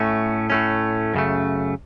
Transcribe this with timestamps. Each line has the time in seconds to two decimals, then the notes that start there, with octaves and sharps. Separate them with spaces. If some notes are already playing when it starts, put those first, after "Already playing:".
Already playing: A2 A3 C#4
0.50 A2 A3 C#4
1.14 F#2 C#3 A3